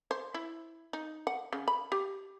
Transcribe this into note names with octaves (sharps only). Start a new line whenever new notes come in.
C5
E4
D#4
F#5
C#3
B5
G4